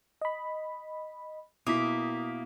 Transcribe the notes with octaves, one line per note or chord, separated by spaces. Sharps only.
D#5 B5
B2 A#3 E4 D#6 B6